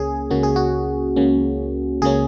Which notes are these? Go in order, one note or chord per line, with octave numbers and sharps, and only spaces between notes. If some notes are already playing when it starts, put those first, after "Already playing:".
Already playing: C#2 C#3 A#3 C#4 G#4
C#2 C#3 A#3 C#4 F#4
G#4
F#4
C#2 C#3 A#3 C#4
C#2 C#3 A#3 C#4 G#4